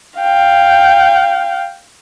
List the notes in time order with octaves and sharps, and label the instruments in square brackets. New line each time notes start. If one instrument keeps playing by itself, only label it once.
[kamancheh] F5 G5